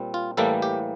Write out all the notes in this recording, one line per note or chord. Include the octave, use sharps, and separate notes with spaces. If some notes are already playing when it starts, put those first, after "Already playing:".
Already playing: A#2 G3 C4
F4
A2 E3 G3 A#3 A4
G4